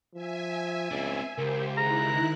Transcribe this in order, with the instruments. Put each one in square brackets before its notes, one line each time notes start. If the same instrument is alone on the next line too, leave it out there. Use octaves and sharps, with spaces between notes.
[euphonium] F3 [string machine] E5 G#5
[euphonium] C#2 [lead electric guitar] C4 D4
[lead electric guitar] C#2 [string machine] G4 C5 [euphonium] A#4
[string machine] D#3 E4 F#6 [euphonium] G#4 [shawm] A#5